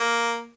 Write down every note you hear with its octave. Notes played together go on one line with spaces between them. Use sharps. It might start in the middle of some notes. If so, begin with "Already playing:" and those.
Already playing: A#3